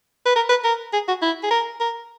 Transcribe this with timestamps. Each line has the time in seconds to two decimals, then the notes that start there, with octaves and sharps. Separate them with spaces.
0.26 B4
0.36 A#4
0.49 B4
0.64 A#4
0.93 G#4
1.08 F#4
1.22 E4
1.43 G#4
1.51 A#4
1.80 A#4